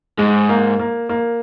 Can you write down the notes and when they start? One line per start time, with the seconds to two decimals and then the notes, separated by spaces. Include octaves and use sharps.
0.18 G#2 G#3
0.49 A#3
0.79 A#3
1.09 A#3